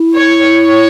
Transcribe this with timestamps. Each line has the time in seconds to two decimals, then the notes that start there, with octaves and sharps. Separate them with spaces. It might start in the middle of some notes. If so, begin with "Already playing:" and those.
Already playing: E4
0.17 C#5
0.59 C#5